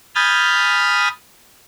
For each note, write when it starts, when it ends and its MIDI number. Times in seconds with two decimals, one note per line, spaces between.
0.15 1.08 80
0.15 1.08 83
0.15 1.08 87
0.15 1.08 89
0.15 1.08 91
0.15 1.08 93